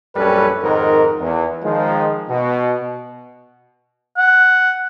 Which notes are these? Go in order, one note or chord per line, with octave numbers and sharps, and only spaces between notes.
A#1 F#2 G3 C#4 A4 B4
F2 G#2 D#3 D#4 A#4
E2
D#3 F3 G#3
B2
F#5